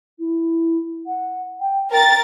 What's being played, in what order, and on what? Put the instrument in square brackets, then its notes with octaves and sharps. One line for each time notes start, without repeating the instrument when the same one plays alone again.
[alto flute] E4
F#5
G5
[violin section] A#4 A6 [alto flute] G5